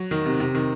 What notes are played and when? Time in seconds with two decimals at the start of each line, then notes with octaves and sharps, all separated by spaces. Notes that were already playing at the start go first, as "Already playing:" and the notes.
Already playing: F#3
0.11 D#3
0.26 C3
0.40 C3
0.55 D#3